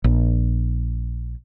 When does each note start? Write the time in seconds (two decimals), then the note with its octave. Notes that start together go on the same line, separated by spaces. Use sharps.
0.04 A#1